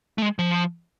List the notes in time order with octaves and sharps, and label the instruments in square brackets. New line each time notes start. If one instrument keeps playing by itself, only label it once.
[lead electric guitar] A3
G#3
F3